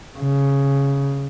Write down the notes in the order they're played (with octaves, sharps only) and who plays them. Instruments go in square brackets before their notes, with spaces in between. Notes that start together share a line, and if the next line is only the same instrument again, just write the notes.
[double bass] C#3